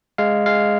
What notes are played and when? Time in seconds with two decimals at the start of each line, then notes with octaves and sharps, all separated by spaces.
0.18 G#3 F5
0.46 G#3 F5